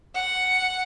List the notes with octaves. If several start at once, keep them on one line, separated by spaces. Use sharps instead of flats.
F#5